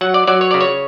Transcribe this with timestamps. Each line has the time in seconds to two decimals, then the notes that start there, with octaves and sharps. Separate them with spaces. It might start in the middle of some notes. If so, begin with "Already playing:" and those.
0.01 F#3 F#5
0.14 D5
0.27 F#3 D5
0.41 C#5
0.51 C#3 D5
0.61 C#5